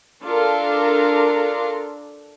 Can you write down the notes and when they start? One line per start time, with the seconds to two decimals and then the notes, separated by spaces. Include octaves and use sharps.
0.24 D4 F4 A4 A#4